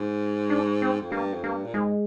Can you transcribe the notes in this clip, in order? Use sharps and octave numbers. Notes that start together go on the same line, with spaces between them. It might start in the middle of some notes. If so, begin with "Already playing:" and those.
Already playing: G#2
D4
C4
F2
G2 A#3
F2
G2 A#3
A#2
G#2 G#3